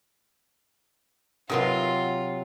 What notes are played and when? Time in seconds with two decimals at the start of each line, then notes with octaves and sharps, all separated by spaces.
1.49 C3 F#3 D#4 F4 A#4 B4 C6